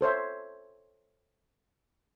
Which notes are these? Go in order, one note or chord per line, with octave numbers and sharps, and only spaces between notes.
A4 C5 C#5 E5